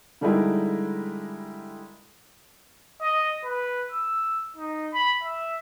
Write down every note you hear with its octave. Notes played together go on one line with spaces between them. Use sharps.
D3 G3 G#3 D#4 E4 A#4
D#5
B4
E6
D#4
B5
E5